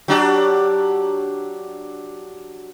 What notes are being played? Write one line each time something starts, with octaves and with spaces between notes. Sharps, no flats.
F#3 D4 G4